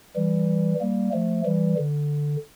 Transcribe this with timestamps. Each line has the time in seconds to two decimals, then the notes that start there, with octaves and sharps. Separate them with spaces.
0.16 E3 G3
0.80 G3 A#3
1.12 F3 A3
1.45 E3 G3
1.78 D3